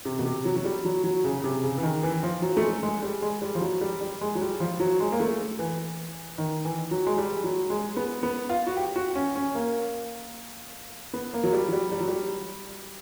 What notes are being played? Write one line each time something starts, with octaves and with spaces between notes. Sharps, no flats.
C3
B2
C3
F#3
F#3
G3
F#3
F#3
C#3
C#3
C3
C#3
E3
D#3
E3
F3
F#3
A3
G#3
G#3
G3
G#3
G3
F3
F#3
G3
G3
G#3
F#3
G3
F3
F#3
G#3
A#3
A3
E3
D#3
E3
F#3
G#3
G3
F#3
G#3
B3
B3
F4
F#4
G4
F#4
C#4
C#4
A#3
B3
A#3
F#3
G3
F#3
G3
G3
F#3
G3